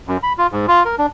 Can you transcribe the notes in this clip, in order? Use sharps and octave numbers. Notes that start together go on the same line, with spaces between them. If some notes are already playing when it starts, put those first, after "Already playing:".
F#2
B5
F4
G#2
F4
A#4
D4